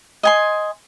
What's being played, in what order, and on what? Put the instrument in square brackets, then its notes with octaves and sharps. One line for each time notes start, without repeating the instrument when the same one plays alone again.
[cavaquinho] D#5 G#5 C6